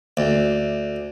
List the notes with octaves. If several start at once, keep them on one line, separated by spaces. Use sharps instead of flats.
D2